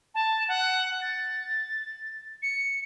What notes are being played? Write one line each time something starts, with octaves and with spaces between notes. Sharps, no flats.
A5
F#5
A6
C#7